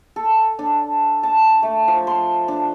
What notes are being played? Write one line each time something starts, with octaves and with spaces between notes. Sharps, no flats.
A4
D4
A5
A3
F3
C6
D4